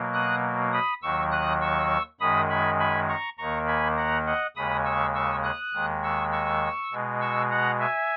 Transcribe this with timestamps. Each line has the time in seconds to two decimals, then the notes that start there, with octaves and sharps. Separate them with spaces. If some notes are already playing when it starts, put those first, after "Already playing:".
Already playing: B2 F#3 A#3
0.14 D#6 F#6
0.73 B5 D#6
1.02 D#2 D#3 F#3 C#6 E6
1.32 D#6 F#6
1.61 C#6 E6
2.20 F#2 D#3 G#3 B5 D#6
2.50 G#5 B5
2.79 G#5 B5
3.09 A#5 C#6
3.38 D#2 D#3 A#3 A#5 C#6
3.67 G#5 B5
3.97 F#5 A#5
4.26 D#5 F#5
4.56 D#2 C#3 G#3 B5 D#6
4.85 C#6 E6
5.15 C#6 E6
5.44 D#6 F#6
5.74 D#2 D#3 G#3
6.03 C#6 E6
6.32 C#6 E6
6.91 B2 G#3
7.21 C#6 E6
7.51 F#5 A#5
7.80 E5 G#5